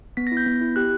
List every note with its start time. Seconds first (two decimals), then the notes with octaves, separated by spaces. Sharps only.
0.17 B3 B6
0.27 A#6
0.32 E4
0.37 G6
0.47 B3
0.61 E4
0.76 G4 F#6